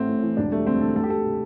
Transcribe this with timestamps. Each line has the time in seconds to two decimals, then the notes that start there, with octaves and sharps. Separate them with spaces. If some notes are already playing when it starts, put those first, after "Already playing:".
Already playing: A1 A3 C4
0.09 A2
0.23 E3
0.37 E1 D4
0.52 G3 A3
0.66 D2 C4
0.81 D3 A4
0.96 D2 A4
1.03 G4
1.10 D2 A4
1.24 C3